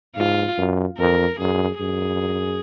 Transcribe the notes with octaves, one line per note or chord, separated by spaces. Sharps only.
G#2 F4
F#2
F2 A#4
F#2 G#4
F#2 G#4